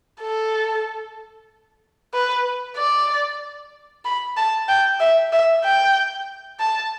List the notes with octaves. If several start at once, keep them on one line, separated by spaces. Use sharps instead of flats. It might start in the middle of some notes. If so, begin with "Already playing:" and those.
A4
B4
D5
B5
A5
G5
E5
E5
G5
A5